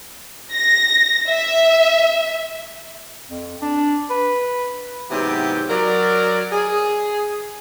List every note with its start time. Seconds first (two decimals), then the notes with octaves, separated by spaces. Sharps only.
0.53 A#6
1.29 E5
3.28 F2
3.61 D4
4.10 B4
5.10 G#2 C3 E3 F#3 B3 G4
5.69 F#3 A#4 D5
6.52 G#4